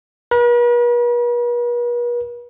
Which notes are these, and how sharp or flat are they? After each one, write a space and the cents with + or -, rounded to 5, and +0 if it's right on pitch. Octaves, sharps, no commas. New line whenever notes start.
B4 -45